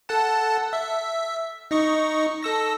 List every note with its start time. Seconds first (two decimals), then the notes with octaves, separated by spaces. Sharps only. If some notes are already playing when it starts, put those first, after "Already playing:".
0.09 A4 F#5 A5
0.73 E5
1.71 D#4 D#5 C#6
2.43 A4 E6 A#6